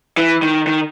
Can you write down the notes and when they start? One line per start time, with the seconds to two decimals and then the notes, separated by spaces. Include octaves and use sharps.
0.17 E3
0.42 D#3
0.67 D#3